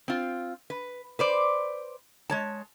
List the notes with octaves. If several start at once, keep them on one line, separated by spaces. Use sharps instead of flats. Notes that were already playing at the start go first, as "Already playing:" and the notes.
C4 F4
B4
B4 C5 D5
G#3 C#5 A5